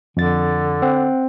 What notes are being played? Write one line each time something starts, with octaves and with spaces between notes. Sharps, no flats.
F2 D3 A6
C4 F#5